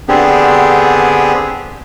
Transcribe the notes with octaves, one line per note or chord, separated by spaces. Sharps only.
D3 B3 C4 D4 G4 G#4